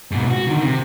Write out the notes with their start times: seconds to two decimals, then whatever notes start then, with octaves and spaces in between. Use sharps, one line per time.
0.11 G#2 B2
0.30 F#4
0.47 D3 D#3
0.63 C3